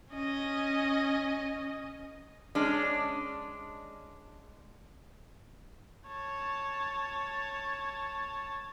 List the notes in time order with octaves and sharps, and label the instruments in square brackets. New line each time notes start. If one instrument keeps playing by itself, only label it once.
[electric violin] C#4 D#5
[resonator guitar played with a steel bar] G#3 C#4 D4
[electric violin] C#5 A5